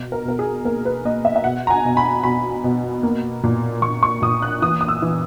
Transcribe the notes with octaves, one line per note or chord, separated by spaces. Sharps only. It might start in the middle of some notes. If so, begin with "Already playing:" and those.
Already playing: B2
A#4
B2 A#4
G#4
A#3 A#4
B4
A#3 D#5
E5
E5
B2 F#5
A#5
G#5
B2
B5
B2 B5
B2
A#3
A#2
A#2 C#6
C#6
A#2 D#6
F#6
E3 D#6
D#6
E6
E3